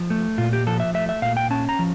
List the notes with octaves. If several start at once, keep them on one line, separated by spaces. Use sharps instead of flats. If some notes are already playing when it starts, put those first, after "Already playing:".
Already playing: F3
A3
A#2 F4
G4
F3 A4
E5
A3 E5
E5
A#2 F5
G5
C#4 A5
A#5
F3